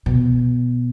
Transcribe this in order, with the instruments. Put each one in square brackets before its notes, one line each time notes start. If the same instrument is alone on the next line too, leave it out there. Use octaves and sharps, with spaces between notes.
[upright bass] B2